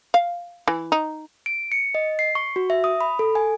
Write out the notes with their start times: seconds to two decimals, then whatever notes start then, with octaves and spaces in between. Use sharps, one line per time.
0.14 F5
0.68 E3
0.92 D#4
1.46 D7
1.72 C#7
1.95 D#5
2.19 C7
2.35 C#6
2.56 F#4
2.70 E5
2.84 D#6
3.01 B5
3.19 A4
3.35 G#5